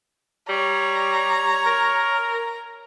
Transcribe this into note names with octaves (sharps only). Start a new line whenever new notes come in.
G3 C#5 A#5
A#4